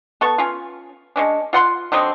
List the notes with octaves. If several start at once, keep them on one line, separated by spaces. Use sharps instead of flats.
B3 A4 C#6
C#4 F4
G#3 C#4 D4
F4 F#5 C6
D3 F#3 C4 D#5